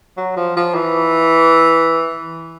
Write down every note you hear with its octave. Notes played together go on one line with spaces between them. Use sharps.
F#3
F3
F3
E3